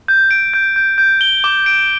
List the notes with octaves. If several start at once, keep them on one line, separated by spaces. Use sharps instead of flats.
G6
D7
G6
G6
G6
G7
D6
D7